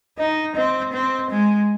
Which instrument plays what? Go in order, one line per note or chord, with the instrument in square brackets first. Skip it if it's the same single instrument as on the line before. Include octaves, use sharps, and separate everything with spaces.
[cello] D#4 [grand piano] D#5
[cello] C4 [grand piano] D#5
[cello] C4
G#3